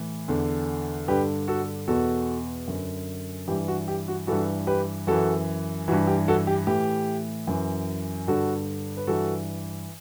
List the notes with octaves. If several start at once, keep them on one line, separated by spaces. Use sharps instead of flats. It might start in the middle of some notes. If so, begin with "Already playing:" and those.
Already playing: A2 E3
E2 D3
G2 D3 G4 B4
F#4 A4
E2 B2 F#4 A4
F#2 D3
G2 E3 G4
F#4
G4
F#4
G2 E3 F#4 A4
G4 B4
F#2 E3 F#4 A4
G2 E3 F#4
G4
F#4 A4
G4
A2 E3 G4
F#2 E3
G2 D3 F#4 A4
B4
G2 E3 F#4 A4